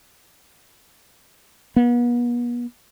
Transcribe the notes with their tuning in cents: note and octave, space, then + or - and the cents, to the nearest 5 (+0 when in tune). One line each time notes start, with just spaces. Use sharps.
B3 -40